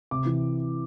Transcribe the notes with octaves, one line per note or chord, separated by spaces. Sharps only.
C3 D6
E3